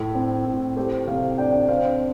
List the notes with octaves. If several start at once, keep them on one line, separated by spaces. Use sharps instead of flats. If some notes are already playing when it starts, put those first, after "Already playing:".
Already playing: A2 A4
C4
A2
A3 G4 C5
C3 C5 F5
D4 D5 G5
C4 C5 F5